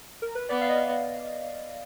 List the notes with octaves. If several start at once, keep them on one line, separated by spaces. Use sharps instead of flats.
A#4
B4
B3 D5
F5
D#5